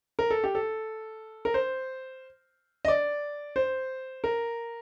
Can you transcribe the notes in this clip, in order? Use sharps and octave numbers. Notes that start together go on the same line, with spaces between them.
A#4
A4
G4
A4
A#4
C5
D#5
D5
C5
A#4